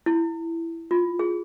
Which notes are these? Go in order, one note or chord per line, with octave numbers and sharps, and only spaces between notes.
E4
F4
G#4